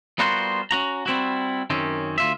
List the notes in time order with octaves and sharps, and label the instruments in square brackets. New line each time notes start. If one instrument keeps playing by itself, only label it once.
[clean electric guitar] G3 B3 F4 F#4 A#4 C5
C#4 F#4 A#5
G3 C4 E4 F#4
F#2 D#3 C4 C#4
D2 F4 E5